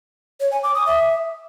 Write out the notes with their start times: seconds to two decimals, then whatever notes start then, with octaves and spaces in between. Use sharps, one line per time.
0.40 C#5
0.52 G#5
0.63 D6
0.75 D#6
0.86 E5